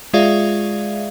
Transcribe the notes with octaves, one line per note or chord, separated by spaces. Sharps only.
G#3 F4 G#4 D5 E5 F5